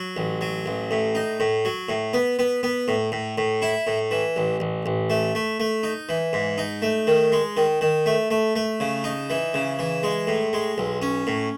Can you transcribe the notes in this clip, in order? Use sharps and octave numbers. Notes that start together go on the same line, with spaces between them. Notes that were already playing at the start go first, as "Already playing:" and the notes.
Already playing: F#3
A1
F#3
A1
A2
D#4
A2
F#3
A2
B3
B3
B3
A2
A2
A2
E4
A2
E3
A1
A1
A1
A3
A3
A3
D#4
E3
G#2
D#4
A3
D#3
G#3
D#3
D#3
A3
A3
A3
C#3
D#4
E3
C#3
E3
G#3
A2
G#3
B1
C#4
A2